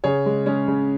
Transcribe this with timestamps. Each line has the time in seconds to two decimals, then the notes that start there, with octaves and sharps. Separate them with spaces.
0.04 C#3 G#4 C#5
0.26 G#3
0.46 G#3 C#4
0.68 C#3